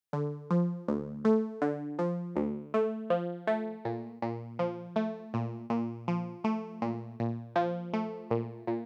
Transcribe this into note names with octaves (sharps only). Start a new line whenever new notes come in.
D3
F3
D2
A3
D3
F3
D2
A3
F3
A3
A#2
A#2
F3
A3
A#2
A#2
F3
A3
A#2
A#2
F3
A3
A#2
A#2